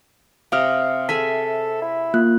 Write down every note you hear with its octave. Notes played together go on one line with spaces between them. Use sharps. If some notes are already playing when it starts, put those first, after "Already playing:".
C3 G4 F5 A#5 D#6 F6
G#4 A4 E5 G#5 B6
E4
A#3 F4 F#6